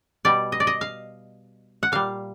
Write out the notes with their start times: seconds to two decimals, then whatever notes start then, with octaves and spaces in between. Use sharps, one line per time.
0.25 B2 G3 D5
0.52 D#5
0.60 D5
0.67 D#5
0.81 F5
1.83 F#5
1.92 A#2 G3 F5